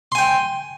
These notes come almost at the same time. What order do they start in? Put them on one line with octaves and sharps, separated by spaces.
C6 G#5 G5